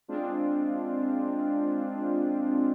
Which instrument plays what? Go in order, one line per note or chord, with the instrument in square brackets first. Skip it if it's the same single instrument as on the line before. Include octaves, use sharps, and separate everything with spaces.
[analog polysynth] G#3 C4 D4 F4